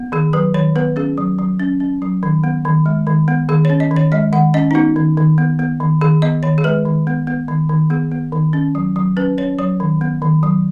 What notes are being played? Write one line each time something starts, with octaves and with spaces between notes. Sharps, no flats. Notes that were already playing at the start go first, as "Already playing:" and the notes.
Already playing: B3
D#3 G#4
F#3 B4
D#3 C#5
B3 B4
C#4 G#4
F#3
F#3
C#4
C#4
F#3
D#3
B3
D#3
G#3
D#3
B3
D#3 G#4
C#5
C#4
D#5
D#3
C#5
G#3 D#5
D#3 F#5
C#4 D#5
D#4
B3 F#4
D#3
D#3
B3
B3
D#3
D#3 G#4
B3 D#5
D#3 C#5
G#4
G#3 B4
D#3
B3
B3
D#3
D#3
B3 G#4
B3
D#3
C#4
F#3
F#3
C#4 B4
C#4 C#5
F#3 C#5
D#3
B3
D#3
F#3